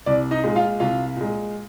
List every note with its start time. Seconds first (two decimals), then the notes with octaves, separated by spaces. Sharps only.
0.06 C2 D5
0.31 D#4 D#5
0.44 A#2 G#3
0.56 F4 F5
0.80 C2 F4 F5
1.17 A#2 G#3